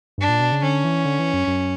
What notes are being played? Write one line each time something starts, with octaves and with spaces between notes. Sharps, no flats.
G2 D4
A#2
B2
C#3
D3 C#4
E3
D3
E3
F#2
F#2